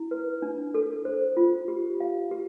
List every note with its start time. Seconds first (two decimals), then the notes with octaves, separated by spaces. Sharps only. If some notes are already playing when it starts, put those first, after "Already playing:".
Already playing: E4
0.11 B4
0.42 D4
0.74 A4
1.05 C5
1.37 F4
1.68 G4
2.00 F5
2.31 G4